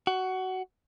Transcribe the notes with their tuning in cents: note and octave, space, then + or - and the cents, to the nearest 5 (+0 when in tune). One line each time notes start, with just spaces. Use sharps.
F#4 +15